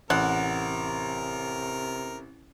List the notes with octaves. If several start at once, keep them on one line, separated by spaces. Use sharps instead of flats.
A1 C3 A#4 F#5